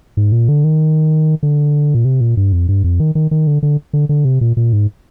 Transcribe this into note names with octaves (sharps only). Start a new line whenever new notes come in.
G#2
A#2
D3
D#3
D3
A#2
C3
A#2
G2
F2
G2
F2
D#3
D#3
D#3
D3
D3
D3
D3
C3
A#2
A#2
G#2